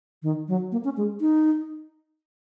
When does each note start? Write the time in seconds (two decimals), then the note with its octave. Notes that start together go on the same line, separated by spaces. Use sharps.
0.23 D#3
0.48 F#3
0.72 A#3
0.84 C#4
0.97 G#3
1.21 D#4